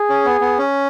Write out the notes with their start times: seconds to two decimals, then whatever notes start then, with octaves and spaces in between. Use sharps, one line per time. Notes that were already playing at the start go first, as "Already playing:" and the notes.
Already playing: G#4
0.09 C#4
0.25 B3
0.41 B3
0.58 C#4